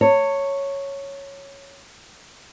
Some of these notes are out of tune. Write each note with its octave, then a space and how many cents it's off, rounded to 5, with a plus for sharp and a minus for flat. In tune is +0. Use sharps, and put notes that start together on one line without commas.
C#5 +0 A5 +45